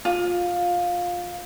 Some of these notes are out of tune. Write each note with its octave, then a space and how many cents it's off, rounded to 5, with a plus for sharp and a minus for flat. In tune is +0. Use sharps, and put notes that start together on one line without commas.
F4 +15